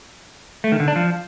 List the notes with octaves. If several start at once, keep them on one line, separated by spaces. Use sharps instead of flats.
A3
D#3
D3
D4
F3